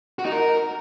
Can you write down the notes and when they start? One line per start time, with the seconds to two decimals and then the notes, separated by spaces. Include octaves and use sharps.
0.19 F#4
0.25 D#4
0.32 A#4